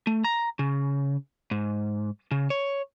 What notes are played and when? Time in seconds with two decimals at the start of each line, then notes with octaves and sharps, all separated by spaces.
0.07 A3
0.24 A#5
0.59 C#3
1.51 G#2
2.31 C#3
2.50 C#5